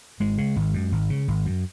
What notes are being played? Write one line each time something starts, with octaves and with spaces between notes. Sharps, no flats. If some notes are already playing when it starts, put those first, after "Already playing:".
G#1 G#3
C#3
G#1
F#2
G#1
C#3
G#1
F#2